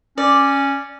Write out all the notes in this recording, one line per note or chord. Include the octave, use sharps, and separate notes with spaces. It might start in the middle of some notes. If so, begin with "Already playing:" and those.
C#4 D5